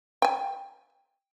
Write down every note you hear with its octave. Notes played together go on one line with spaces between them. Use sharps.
G5 G#5